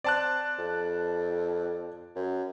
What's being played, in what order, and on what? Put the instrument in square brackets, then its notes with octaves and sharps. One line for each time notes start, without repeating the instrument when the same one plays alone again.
[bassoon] C4 [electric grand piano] D5 A5 F#6
[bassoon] F2
F#2